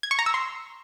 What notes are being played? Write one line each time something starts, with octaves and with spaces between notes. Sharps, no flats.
G#6
C#6
A#5
E6
C6